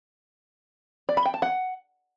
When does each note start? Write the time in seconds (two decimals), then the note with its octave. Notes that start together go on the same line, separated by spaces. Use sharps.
1.09 D5
1.17 B5
1.25 G5
1.34 A5
1.42 F#5